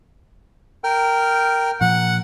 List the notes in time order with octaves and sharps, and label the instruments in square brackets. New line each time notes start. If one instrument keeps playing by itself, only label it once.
[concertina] A#4 G5 F6
[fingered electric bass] A#2 F3 [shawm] F#5